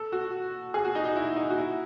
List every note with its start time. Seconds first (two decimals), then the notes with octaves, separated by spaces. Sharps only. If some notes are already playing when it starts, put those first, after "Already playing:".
Already playing: A4
0.12 F#4
0.74 G#4
0.85 F#4
0.95 D#4
1.05 D#4
1.16 E4
1.36 D#4
1.50 F#4
1.57 E4